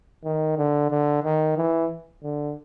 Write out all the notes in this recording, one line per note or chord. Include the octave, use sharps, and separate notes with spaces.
D#3
D3
D3
D#3
E3
D3